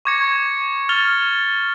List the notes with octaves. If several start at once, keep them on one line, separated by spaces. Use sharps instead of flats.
C#6 D6 G#6 A#6 C#7
F6 A6 F7 G7